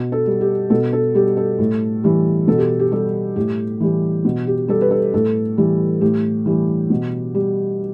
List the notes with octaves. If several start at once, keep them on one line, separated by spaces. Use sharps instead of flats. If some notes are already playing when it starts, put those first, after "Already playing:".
Already playing: B2
A4
G3
G4
B2 A4
A4
G3 G4
A4
A2
E3 G3
B2 A4
G4
G4
G3 A4
A2 G4
E3 G3
B2
G4
G3 A4
B4
A4
A2 A4
E3 G3
A2 G4
E3 G3
B2
G3